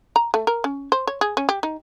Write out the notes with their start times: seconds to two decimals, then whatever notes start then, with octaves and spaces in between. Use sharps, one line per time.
0.16 A#5
0.34 A3
0.47 A#4
0.64 C#4
0.92 C5
1.07 C#5
1.21 G#4
1.37 C#4
1.49 G4
1.63 D#4